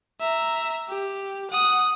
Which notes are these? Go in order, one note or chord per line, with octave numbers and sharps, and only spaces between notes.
E5 A#5
G4
F#5 D#6